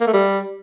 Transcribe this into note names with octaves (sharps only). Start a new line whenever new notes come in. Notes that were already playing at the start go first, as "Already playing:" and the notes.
A#3
A3
G3